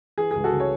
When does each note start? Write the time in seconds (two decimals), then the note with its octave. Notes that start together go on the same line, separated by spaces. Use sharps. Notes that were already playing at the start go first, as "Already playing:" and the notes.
0.18 E3 G#4
0.31 G#4
0.35 C#2
0.44 F#4 A4
0.53 C#3
0.60 C#5